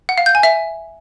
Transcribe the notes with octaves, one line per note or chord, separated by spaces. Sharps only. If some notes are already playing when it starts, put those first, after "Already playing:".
F#5
F5
G6
G#5
E5